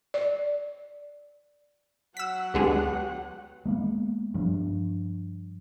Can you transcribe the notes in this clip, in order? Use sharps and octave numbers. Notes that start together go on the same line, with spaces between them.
D5
F#3 F#5 E6 B6
D2 D3 G#3 B3 G4
G#3 A#3 B3
G2 F3